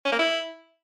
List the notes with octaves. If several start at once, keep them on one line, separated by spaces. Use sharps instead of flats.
C#4
A#3
E4